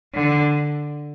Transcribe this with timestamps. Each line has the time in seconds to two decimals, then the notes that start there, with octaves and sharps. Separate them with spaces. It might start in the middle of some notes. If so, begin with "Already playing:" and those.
0.14 D3